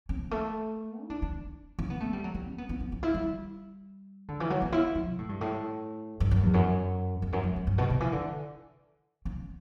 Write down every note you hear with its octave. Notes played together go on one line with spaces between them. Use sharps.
C#4
G3
A3
E4
D4
D4
C#4
B3
A3
G3
F#3
G3
C#4
B3
B3
C#4
C#4
E4
G3
D3
E3
F#3
B3
E4
F#3
B2
A2
G2
A2
G2
F#2
E2
F#2
E2
F#2
F#2
F#2
G2
B2
C#3
E3
D3
C#4